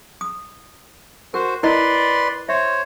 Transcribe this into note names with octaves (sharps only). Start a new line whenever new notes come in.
D#6
F#4 A#4 C5
E4 A#4 B4 D5 D#5 C6
C5 C#5 E5